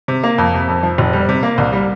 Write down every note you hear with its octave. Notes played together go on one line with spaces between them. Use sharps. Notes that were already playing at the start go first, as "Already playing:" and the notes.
C3
A#3
F2
C3
F2
F3
F1
G3
C3
A#3
C2
G3